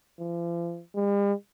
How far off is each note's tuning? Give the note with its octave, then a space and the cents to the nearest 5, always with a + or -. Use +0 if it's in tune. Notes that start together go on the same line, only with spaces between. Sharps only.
F3 -40
G3 +45